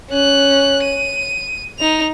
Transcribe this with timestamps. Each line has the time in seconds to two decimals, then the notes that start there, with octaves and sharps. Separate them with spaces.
0.10 C#4 F#6
0.83 D#7
1.79 D#4 F7